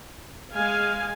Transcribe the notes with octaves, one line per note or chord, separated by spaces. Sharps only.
G#3 F5 G#5